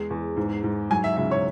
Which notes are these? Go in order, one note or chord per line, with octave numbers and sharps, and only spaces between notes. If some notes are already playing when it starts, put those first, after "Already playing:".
Already playing: E2 G#3
E2
G#2
G#2
F#3 G#5
E5
C#2 E5
C#5